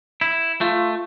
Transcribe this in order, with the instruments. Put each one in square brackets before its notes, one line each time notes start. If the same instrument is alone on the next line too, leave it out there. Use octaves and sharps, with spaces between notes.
[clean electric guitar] E4
[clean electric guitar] A3 [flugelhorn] F4